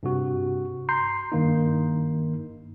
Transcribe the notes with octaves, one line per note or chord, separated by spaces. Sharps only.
G2 C3 F#4
A#5 C6 G6 C7
G2 D#3 A#3 D#4